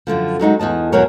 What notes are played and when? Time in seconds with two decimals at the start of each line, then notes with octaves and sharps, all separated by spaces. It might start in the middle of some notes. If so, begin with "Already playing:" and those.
0.07 F#2 A2 D3 F3
0.39 F#3 G#3 D#4 F#4
0.59 E2 E3 D#5 A5
0.92 E2 B2 F#3 A#4 C#5